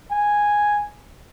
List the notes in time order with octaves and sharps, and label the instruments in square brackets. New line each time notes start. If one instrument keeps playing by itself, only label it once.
[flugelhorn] G#5